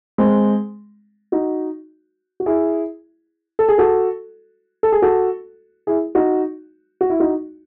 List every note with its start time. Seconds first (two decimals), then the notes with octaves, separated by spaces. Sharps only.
0.18 G#3 C4
1.32 D#4 F#4
2.40 F#4
2.46 E4 G#4
3.59 A4
3.69 G#4
3.78 F#4 A4
4.83 A4
4.92 G#4
5.02 F#4 A4
5.87 E4 G#4
6.15 D#4 F#4
7.01 F#4
7.10 E4
7.20 D#4 F#4